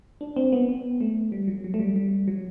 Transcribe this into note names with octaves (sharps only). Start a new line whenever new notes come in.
D4
C4
B3
B3
A3
G3
F#3
F#3
A3
G3
G3
F#3